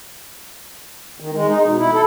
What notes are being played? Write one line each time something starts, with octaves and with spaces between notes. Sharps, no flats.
D#3
G#3
D#4
B2
E4
A4